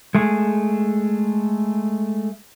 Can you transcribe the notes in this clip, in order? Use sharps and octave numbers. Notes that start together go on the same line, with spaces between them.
G#3 A3 G#4